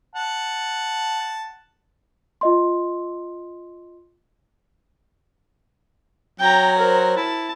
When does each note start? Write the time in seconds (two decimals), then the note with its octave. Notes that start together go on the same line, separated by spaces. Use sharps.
0.15 F#5 A5
2.41 F4 D#5 C6
6.40 F#3 G5 A#5
6.78 A#4 C5
7.17 E4 A5